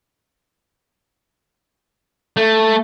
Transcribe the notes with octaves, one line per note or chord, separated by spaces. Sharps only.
A3